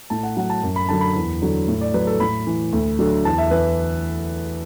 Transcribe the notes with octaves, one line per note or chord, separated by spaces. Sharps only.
A2 A5
F#5
F#3 F#5
A5
F#2
B5
D3 F#3 A5
B5
E2
D3 F#3
A2
D5
F#3 B4
A4
A2 B5
E3
D2
D3 F#3
E2 A5
E5
E3 B4